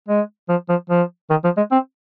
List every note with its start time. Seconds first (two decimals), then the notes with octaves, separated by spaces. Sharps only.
0.09 G#3
0.49 F3
0.69 F3
0.90 F3
1.30 D#3
1.44 F3
1.57 G#3
1.72 C4